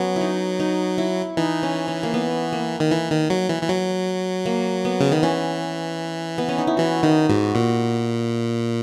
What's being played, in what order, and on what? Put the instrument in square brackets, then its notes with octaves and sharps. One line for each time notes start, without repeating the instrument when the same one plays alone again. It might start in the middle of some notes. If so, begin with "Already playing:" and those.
Already playing: [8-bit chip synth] F#3 [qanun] B3 C#4
[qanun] D#4 E4
D#4
E4
[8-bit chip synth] E3 [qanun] D#4
[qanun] C#4
C#4
A#3
B3
A#3
[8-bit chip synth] D#3
E3
D#3
F#3
E3
E3
F#3
[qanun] A#3
B3
[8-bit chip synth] C#3
D#3
[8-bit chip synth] E3 [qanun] C#4
[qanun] B3
C#4
D#4
E4
[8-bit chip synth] E3 [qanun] F#4
[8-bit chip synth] D#3 [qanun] D#4
[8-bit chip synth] G#2 [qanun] F#4
[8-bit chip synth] A#2